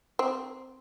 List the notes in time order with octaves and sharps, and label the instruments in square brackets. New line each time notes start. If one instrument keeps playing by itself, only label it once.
[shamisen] C4